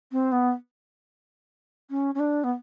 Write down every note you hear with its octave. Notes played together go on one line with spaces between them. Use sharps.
C4
B3
C#4
C#4
D4
B3